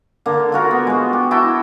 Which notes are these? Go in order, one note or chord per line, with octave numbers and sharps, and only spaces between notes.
D3 A#3
F4 F#4 A#4
B3
G#3 F#4
G4
E4 F#4 G5 A5